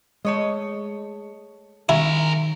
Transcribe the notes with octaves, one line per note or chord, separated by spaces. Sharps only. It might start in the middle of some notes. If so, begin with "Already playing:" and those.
G#3 A3 C#5 D#5
D#3 C#4 E4 G#4 A#4 G#5